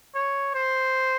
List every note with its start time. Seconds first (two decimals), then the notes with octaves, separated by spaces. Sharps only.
0.15 C#5
0.54 C5